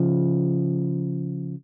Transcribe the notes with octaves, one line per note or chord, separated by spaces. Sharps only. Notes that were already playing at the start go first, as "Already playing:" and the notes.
Already playing: C#3 F3